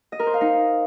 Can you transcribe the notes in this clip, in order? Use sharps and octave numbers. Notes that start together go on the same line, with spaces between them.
D#5
A#4
C5
F5
D#4